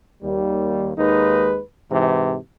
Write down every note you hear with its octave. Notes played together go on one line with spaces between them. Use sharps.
D#2 G3
D#2 G#3 D#4 B4
G#2 C3 E3